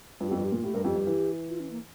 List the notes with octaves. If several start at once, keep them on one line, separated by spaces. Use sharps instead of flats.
G2 F4
G4
F2
G2 F4
G4
A#2
A2 G4
G2 A#4
F2 G4
G2
E3
F4
C#4
A#3